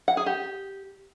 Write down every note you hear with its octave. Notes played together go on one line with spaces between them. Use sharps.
F#5
G#4
G4